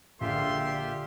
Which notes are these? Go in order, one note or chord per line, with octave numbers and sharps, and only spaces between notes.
A#1 D3 A#3 F4 G4 E5 C6